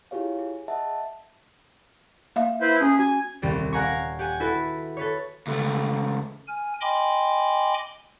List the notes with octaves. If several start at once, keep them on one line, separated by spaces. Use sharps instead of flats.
E4 F4 G4 G#4 C#5 F5
G#4
D#5 E5 F#5 A5
A#3 E5 F5
E4 B4 C5
C#4 G#4
F#4 G#5
D#1 C2 G3 C4
A#4 F5 F#5 G#5 A#5 C#6
G4 F#5 G#5
E4 F#4 A4 B4
A4 B4 C#5
C#2 A3
G#5 F6
D#5 G5 G#5 B5 C6 D6